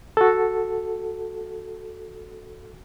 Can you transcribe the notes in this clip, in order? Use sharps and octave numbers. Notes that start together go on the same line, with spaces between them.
F#4 A4